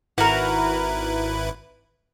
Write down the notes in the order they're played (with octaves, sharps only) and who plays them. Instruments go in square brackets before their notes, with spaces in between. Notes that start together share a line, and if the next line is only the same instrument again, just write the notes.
[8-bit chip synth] G#1 E4 B4 [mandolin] F#4 A#4